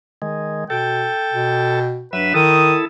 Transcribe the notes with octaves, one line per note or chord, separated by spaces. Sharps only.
D#3 G#3
B2 A4 G5
B2
G2 F#3 B4 E5
D#3 E4 A4 D#6